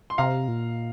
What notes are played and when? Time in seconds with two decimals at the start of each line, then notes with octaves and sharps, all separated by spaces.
0.10 C6
0.18 C3 F5 A#5
0.48 A#2